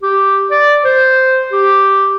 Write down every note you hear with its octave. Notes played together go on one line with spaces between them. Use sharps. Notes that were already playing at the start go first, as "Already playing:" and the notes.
G4
D5
C5
G4